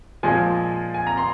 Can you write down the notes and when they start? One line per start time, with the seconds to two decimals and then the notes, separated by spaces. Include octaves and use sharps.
0.23 A#2 F3 G#3 G#5
0.94 G#5
1.07 A#5
1.18 C6